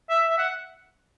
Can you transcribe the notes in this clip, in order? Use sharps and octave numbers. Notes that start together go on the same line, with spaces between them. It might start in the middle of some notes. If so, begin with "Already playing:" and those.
E5
E5
F#5